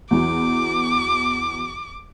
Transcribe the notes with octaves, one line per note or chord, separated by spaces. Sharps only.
E2 E3 F#3 D6